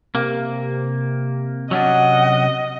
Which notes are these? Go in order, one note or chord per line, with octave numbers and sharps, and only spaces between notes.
C3 A#3
F#3 C#4 D4 D#5 F#5